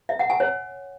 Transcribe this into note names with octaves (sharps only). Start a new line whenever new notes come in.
E5
F#5
G#5
C#5